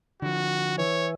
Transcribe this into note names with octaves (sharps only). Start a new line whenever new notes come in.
D3 F3 F#4
E3 C#5